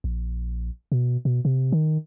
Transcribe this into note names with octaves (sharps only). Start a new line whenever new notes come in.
A#1
B2
B2
C3
D#3